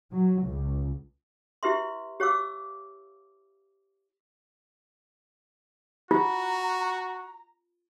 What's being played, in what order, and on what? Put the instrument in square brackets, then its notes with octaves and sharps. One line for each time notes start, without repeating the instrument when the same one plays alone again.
[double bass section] F#3
C#2
[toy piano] E4 G4 B4 E5 C6
G4 C#5 F5 D6 E6
[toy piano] F4 [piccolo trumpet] F#4 [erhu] A#5